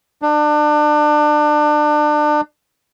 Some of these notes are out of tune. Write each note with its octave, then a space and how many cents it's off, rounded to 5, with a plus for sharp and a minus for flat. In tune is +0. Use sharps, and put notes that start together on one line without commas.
D4 +30